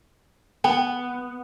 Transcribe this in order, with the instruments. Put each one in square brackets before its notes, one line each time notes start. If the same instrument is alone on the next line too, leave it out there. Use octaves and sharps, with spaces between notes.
[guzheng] B3 [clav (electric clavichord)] G5